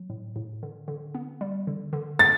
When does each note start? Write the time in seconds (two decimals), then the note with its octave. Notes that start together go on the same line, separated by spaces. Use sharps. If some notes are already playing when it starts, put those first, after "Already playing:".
Already playing: F#3
0.10 A2
0.36 A2
0.63 D3
0.88 D3
1.15 B3
1.41 G3
1.67 D3
1.93 D3
2.19 A6